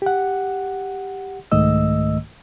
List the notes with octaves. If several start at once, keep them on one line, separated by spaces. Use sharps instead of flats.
G4 F#5
C2 G#2 D#3 A3 D#5 E6